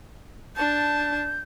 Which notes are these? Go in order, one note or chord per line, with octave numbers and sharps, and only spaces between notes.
D4 A5 G6